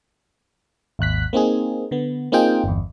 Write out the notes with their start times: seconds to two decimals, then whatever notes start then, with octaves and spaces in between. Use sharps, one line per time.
0.99 G#1 D#2 F#6 B6
1.33 A#3 C4 D#4 G#4
1.91 D3 B3
2.32 A#3 C4 D#4 F4 G#4 G5
2.64 G1 E2